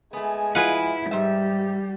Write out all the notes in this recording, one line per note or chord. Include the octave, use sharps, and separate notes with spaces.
G#3 A3 B3 G#5
E4 F4 G#4 B4 D#5 F#5
G#2 G3 G4 E5